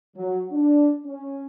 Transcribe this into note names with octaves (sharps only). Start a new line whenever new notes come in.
F#3
D4
C#4